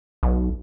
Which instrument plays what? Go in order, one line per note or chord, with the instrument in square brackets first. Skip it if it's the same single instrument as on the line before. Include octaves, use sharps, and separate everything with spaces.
[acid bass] B1